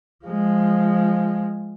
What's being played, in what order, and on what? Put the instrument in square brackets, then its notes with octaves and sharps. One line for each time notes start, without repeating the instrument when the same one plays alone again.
[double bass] F3 G#3